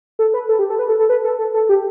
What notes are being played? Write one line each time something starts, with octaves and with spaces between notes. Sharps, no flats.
A4
B4
A4
G4
A4
B4
A4
A4
B4
A4
A4
A4
G4